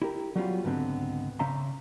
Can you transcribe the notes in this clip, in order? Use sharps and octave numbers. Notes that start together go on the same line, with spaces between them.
E4 G4 A#4
F#3 G3 B3 C#4 F4
C#2 G#2 D3 B3 C4
C#3 C#4 E5 A#5 C6